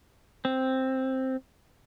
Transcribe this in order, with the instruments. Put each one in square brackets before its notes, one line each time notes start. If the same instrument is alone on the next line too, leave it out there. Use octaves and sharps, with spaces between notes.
[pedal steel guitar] C4